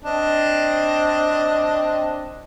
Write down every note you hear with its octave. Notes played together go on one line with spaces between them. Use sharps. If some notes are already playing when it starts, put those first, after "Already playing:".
C4 D4 D#5